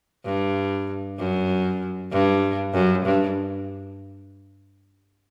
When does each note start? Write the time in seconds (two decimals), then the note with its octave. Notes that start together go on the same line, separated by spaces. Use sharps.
0.25 G2
1.18 F#2
2.11 G2
2.73 F#2
3.05 G2